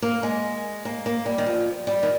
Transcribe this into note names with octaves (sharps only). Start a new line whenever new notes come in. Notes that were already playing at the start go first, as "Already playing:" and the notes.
A#3
G#3
A#3
A#3
G3
D#3
F3
G3
D#3